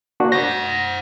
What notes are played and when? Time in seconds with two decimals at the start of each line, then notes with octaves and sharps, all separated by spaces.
0.20 A#3 D4 F#4
0.32 C5 F#5 G6 A#6